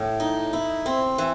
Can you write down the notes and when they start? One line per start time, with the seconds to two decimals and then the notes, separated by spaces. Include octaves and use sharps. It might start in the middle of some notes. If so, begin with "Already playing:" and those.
Already playing: A2
0.20 D#4
0.53 E4
0.86 C4
1.18 E3